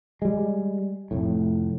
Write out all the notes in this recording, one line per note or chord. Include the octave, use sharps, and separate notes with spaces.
G3 G#3
F1 A2